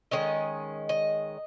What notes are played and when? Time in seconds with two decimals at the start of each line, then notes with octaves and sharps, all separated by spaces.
0.11 D#3 G#3 C#4 D#5
0.89 D#5